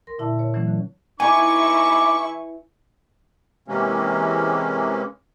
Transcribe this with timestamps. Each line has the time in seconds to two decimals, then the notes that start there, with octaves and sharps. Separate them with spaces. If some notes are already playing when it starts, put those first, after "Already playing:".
0.07 A#4 C6 A#6
0.18 A#2 D3 E4 E5 A5
0.39 C#5
0.54 D3 E3 F#3 A3 C#4
0.67 D3
1.20 E3 D#4 E4 G#5 C#6 D6
3.68 C3 E3 G#3 A#3 C#4